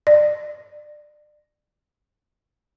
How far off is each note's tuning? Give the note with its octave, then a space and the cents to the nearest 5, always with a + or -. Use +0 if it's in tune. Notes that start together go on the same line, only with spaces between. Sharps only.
D5 +30